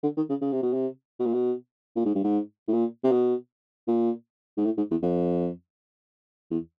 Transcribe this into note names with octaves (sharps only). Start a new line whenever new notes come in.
D3
D#3
C#3
C#3
C3
B2
C3
B2
A#2
B2
A#2
G#2
G2
G#2
A2
A#2
C3
B2
A#2
G#2
A2
G#2
E2
F2
E2